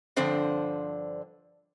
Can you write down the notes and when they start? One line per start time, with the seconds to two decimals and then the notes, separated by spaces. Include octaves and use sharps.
0.16 G2 D3 F3 C4 C5